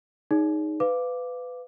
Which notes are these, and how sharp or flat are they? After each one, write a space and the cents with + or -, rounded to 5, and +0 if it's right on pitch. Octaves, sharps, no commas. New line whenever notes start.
D#4 +0 G#4 +0 C#5 +45
B4 +20 F5 +0 D6 +0